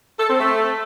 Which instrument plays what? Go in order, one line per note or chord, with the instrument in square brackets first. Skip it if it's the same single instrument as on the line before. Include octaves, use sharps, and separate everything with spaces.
[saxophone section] A4
C4
A3